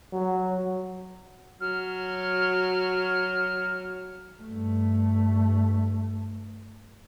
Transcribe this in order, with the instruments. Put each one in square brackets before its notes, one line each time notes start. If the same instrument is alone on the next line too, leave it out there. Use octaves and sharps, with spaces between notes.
[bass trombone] F#3
[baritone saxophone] F#3 [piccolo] F6
[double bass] G2 A3